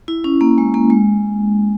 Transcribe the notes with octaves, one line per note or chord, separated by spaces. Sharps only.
E4
C#4
A#3
G#3
A#3
G#3